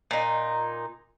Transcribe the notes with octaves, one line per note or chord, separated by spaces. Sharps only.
A#2 D#4